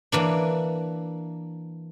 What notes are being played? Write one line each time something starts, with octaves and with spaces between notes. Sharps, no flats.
E3 A#3 D4